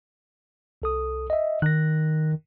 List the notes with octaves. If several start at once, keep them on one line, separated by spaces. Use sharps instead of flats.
C2 A4 D#6
D#5 E5
D#3 F#6 A#6